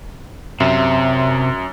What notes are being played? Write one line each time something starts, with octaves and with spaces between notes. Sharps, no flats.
F#2 C3 E5